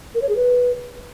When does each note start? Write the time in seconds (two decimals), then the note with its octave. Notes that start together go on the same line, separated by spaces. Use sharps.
0.15 A#4
0.22 C#5
0.29 G#4
0.36 B4